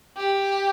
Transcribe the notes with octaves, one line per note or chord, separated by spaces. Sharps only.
G4